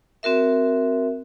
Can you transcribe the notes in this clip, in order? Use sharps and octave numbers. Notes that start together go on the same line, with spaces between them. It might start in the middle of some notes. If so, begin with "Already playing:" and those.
C4 F#4 A#4 E5